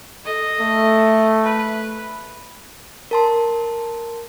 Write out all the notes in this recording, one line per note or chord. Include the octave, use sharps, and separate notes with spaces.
A4 D#5
A3
B4
A#4 A5 C6